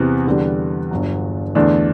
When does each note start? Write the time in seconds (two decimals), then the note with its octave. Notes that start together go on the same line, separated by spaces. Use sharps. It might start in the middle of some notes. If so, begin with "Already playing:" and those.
Already playing: E2 C3 E3 B3
0.27 E2 D3 G3
0.91 G1 G2 F#3
1.55 E2 D3 A3 D4